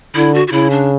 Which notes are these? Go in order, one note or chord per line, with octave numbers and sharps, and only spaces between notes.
D3 E4
F#4
F#4
C#3 E4
D4